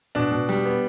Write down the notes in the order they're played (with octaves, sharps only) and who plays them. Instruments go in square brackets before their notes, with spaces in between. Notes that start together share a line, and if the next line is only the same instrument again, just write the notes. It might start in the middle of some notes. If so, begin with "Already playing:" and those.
[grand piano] B2 D4
B2
G3
B3